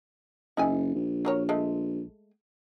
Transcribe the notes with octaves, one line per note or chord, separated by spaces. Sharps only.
F#1 D#4 E4 G#5
A#1
F#3 A#4 C#5
G#3 A3